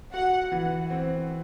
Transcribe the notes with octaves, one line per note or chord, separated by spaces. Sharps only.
F#4 F#5
E3
C4